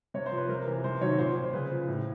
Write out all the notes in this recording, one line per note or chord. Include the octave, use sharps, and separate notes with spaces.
C3 C#5
C5
F3
B4
C3 A#4
E3
C3 C5
D#3 F#3 C#5
A#2 C5
F3
C5
C#3 B4
F3
A2